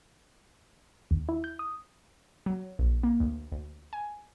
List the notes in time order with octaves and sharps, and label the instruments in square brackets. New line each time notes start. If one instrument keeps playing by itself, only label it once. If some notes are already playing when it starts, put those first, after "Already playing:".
[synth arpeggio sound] D#2
E4
G6
D#6
[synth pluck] F#3
A#1
A#3
D2
D2
G#5